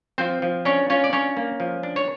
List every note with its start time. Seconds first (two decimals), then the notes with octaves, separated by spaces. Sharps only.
0.18 F3 C4 C5
0.42 F3
0.65 C#4 D4 C#5
0.90 C#4 F4 C#5
1.04 D5
1.12 C#4 D4 C#5
1.37 A#3
1.60 F3
1.83 D4
1.96 C#5